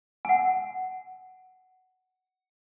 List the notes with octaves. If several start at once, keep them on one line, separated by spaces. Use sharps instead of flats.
F#5 G#5